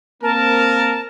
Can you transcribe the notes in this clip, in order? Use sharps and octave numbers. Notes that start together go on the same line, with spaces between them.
A#3 C4 A#4 A5